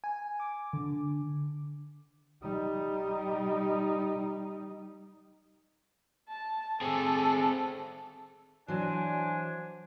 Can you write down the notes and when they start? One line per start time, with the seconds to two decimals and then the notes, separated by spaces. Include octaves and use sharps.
0.04 G#5
0.40 D6
0.73 D3
2.42 G3 D#4
6.28 A5
6.81 C4 G#4 A4
8.68 E3 F#3 D4 C5 G#5